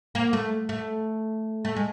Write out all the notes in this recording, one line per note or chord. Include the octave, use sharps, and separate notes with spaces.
A#3
A3
A3
A3
G#3